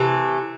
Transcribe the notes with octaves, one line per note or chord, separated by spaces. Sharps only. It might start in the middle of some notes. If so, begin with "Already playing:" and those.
Already playing: C3 E3 A3